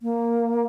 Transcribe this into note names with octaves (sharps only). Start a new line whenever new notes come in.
A#3